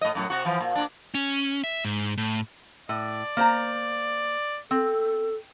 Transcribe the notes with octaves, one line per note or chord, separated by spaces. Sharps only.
A2 D#5
F#2 A2 F#3
C3 F#4
E3 F3
A#2
A#2 D4
C#4
E5
G#2
A2
A2 D5
A#3 C5 A#5
C4 A4